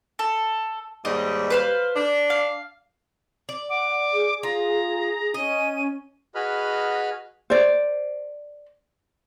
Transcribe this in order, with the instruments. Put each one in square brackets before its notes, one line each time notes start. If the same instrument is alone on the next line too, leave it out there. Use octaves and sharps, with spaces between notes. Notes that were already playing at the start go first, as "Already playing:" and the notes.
[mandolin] A4
[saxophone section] D#2 G#2 G3 [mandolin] D#5
[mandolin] B4 C5 F5
[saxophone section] D4
[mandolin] F5
[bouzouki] D5
[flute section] F#5 [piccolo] D6
[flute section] G#4
[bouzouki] F4 [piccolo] A#5
[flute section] C#4 [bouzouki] D#5 [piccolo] D#7
[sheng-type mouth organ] F#4 G#4 B4 D#5 B5 F6
[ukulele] C5 D5